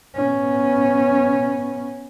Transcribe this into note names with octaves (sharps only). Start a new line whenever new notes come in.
B3 C#4